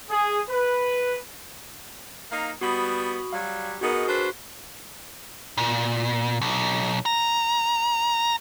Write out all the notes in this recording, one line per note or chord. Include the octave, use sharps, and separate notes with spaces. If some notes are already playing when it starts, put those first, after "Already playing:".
G#4
B4
A#3 D#4 F5
G3 B3 F#4 B5 D#6
F#3 G3 F5
B3 D#4 F#4 G#4 A#4
D4 F#4 B4 C5
A#2
B1
A#5